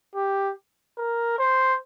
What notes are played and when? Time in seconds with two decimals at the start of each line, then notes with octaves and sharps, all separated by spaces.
0.15 G4
0.97 A#4
1.39 C5